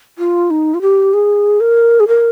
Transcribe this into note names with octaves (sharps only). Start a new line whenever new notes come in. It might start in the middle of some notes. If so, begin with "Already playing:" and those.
F4
D#4
F4
G4
G#4
A#4
G#4
A#4